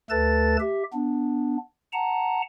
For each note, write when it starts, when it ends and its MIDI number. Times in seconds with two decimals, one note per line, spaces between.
0.10 0.57 38
0.10 0.57 57
0.10 0.57 69
0.10 0.57 71
0.10 0.57 81
0.10 0.57 93
0.60 0.83 67
0.60 0.83 76
0.93 1.57 59
0.93 1.57 62
1.93 2.42 78
1.93 2.42 81
1.93 2.42 82